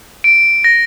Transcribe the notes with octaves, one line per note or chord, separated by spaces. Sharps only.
D7
A#6